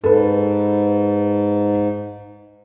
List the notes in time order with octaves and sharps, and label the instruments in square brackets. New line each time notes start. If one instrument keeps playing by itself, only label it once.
[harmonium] G#2 [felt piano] A4 B4